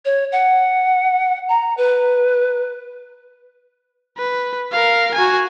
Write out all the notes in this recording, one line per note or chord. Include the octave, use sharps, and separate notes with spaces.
C#5
F#5
A#5
B4
B4
A#4 F5
F#4 G#5